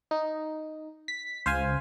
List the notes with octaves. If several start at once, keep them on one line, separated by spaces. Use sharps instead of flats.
D#4
B6
C#2 C5 F5 G#5